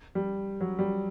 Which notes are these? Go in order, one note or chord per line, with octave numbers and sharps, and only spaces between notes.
G3
F#3
G3